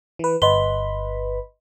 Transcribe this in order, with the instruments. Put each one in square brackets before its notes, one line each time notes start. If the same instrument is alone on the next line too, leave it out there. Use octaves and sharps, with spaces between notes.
[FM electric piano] E3 B4
[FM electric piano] G1 B4 B5 [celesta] D#5 C6 G7